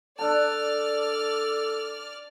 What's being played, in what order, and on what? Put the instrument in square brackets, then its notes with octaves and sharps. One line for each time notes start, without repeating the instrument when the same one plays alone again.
[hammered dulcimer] D4 A5 [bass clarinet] A4 [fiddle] D5 F6